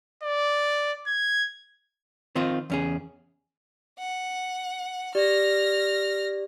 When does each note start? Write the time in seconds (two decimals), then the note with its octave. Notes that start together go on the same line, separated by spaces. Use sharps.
0.23 D5
1.07 G#6
2.35 D#3 C4 D#4 F4
2.70 E2 C#4 G#4
3.99 F#5
5.15 G4 D5 F6 A#6